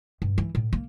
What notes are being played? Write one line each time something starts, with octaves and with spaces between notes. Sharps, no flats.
G2
E3
A2
A#3